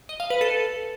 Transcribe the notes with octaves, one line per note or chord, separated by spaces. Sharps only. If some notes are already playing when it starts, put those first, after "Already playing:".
D#5
F5
B4
A4